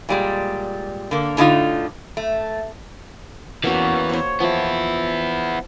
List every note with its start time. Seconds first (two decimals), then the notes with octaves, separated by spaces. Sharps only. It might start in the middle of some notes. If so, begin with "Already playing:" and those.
0.09 A#2 G3 G#3
1.11 D3 A#3
1.37 A2 D3 D#4 F4
2.17 A3
3.64 E3 A#3 B3 C#4 F#4
4.09 C5 C#5
4.40 F3 B3 E4